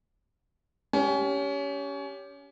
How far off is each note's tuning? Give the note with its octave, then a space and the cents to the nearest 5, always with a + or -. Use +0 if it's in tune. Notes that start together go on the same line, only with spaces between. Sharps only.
C#4 +25 G4 +0